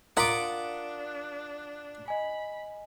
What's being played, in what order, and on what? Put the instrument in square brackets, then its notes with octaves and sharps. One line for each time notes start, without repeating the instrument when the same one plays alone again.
[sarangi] D4 [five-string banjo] F4 A#4 [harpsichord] F#5 D6 [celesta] D#6 B6
[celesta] D#5 G#5 [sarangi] B5